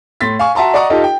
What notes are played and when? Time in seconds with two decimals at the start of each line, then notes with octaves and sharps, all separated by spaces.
0.21 A2 C6 A6 B6
0.39 F5 G#5 C#6
0.55 F#4 E5 A5 A#5 C6
0.74 D5 D#5 F#5 A#5 C#6 D#6
0.90 D#4 F4 G4 A4 D#5
1.04 G5